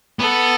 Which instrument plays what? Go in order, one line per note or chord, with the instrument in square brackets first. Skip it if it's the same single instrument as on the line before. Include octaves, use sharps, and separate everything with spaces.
[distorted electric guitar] B3 [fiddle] A4